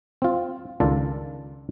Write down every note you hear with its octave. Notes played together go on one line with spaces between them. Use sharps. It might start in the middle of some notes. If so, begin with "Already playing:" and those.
C4 F4
C#2 D#3 D4 F4 A4 D5